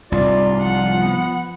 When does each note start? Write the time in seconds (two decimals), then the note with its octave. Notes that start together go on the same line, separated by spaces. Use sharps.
0.12 C2 G#2 F4 D5
0.62 F3 F#5
1.01 B3